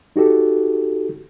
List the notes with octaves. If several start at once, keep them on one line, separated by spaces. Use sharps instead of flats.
D#4 F#4 G4 A4